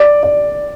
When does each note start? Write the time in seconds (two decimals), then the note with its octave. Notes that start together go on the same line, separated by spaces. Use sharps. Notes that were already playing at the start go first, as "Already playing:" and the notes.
Already playing: D5
0.23 D5